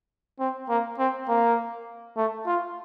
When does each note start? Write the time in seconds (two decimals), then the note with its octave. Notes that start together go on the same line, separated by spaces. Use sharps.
0.40 C4
0.69 A#3
0.99 C4
1.28 A#3
2.17 A3
2.46 F4